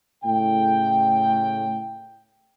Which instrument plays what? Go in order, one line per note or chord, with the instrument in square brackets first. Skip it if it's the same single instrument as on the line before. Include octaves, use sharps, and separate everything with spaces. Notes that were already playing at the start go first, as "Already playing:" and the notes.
[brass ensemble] A2 C#3 G5